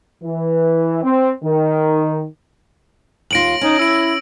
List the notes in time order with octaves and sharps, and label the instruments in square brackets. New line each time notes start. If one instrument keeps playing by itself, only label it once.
[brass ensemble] E3
C4
D#3
[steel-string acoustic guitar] D#2 F4 [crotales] A#6 D7 F#7
[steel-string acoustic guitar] C#4 [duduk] D#4
[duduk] E4 [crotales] E6 D7